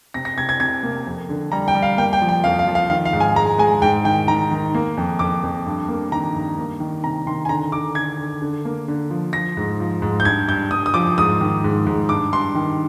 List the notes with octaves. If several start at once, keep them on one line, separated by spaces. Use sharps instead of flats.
C3 A#6
A#6
C3 G#6
G#6
C3 G#6
A#3
F2
D3
G3 A#5
G5
G3
F5
A#3 G5
G5
F3
G5
F2 F5
F5
F3
F5
D#3 F5
F5
G#2
G#5
G#3 A#5
G#3 G#5
G#2 G5
D#3 G5
D#3 A#5
D#3
A#3
F2
F2 D6
F2
G2
A#3
D#3 A#5
G2
A#3
D#3
C3 A#5
D#3 C6
G#5
D3 A#5
D3 D6
D3 G#6
D3
D3
A#3
D3
F3
F3 A#6
G#2
F3
G#2
G6
G2 G#6
G2 G6
G2 D#6
D#6
F3 D6
G#2 D#6
D#3
G#2
G#2
G2 D6
G2 C6
D#3